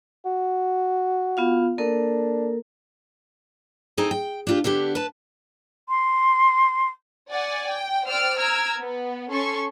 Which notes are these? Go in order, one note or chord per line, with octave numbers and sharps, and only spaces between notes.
F#4
B3 F4 F5
A#3 D4 A4 A#4
C4 D#4 G#4 A4
G5
D4 F4 G4
D3 B3 D4 G4
B4 A5
C6
D5 F#5 G#5
G5
C5 D5 G5 E6 F6 D7
A#5 E6 F6 G#6 D7
B3
C#4 A4 C6 C#6